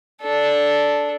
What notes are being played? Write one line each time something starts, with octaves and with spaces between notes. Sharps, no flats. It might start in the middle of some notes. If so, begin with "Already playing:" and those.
D4 A4